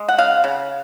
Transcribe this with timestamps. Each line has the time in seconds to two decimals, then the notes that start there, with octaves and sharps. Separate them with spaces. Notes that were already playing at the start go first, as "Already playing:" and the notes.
Already playing: G#3
0.09 F#5
0.18 C#3 F5
0.44 C#3